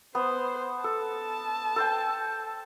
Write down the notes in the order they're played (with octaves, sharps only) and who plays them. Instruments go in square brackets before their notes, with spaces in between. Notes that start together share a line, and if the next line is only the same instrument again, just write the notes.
[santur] B3 [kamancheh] C5
[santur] A4 [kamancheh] A5
[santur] A4 C5 G5